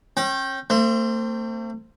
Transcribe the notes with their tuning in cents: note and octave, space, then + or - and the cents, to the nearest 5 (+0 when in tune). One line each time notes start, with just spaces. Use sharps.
C#4 -40 G5 -5
A3 +45 C4 +0